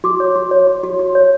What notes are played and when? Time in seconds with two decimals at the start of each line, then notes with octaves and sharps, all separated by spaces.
0.04 F#4 D6
0.20 C#5
0.36 F#4
0.51 C#5
0.67 F#4
0.84 F#4
0.99 F#4
1.15 C#5